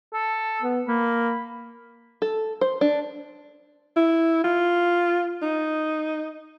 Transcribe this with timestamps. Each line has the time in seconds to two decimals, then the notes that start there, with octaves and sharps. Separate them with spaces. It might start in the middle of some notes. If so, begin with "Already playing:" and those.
0.13 A4
0.62 B3
0.88 A#3 B5
2.22 A4
2.61 C5
2.81 D4
3.96 E4
4.44 F4
5.42 D#4